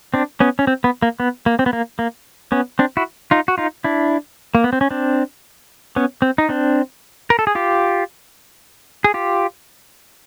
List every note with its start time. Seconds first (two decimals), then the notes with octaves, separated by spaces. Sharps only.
0.14 C4 D4
0.40 B3 C#4
0.59 C#4
0.67 C4
0.84 B3
1.02 A#3
1.20 B3
1.46 A#3
1.59 C4
1.66 B3
1.73 A#3
1.99 A#3
2.52 B3 C#4
2.79 C4 D4
2.97 E4 F#4
3.31 D#4 F4
3.48 F#4
3.58 D#4 F4
3.84 D4 E4
4.55 A#3
4.64 B3
4.73 C4
4.81 C#4
4.91 C4 D4
5.96 B3 C#4
6.22 C4
6.38 D#4
6.49 C4 D4
7.30 A#4
7.39 A4
7.47 G#4
7.55 F4 G4
9.04 G#4
9.14 F4 G4